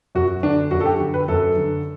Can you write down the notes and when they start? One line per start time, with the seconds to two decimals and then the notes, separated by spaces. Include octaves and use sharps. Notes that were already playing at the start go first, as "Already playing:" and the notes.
0.15 F#2 F#4
0.43 D3 D4
0.71 F#2 F#4
0.80 A4
0.85 G4
1.00 D3
1.14 B4
1.28 F#2 A4
1.57 D3